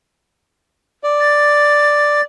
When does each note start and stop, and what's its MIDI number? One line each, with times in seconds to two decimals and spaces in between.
1.04 2.21 74
1.20 2.23 93